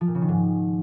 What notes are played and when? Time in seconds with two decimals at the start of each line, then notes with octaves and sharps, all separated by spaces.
0.01 F3
0.08 A#2
0.15 C#3
0.22 D#3
0.29 G#2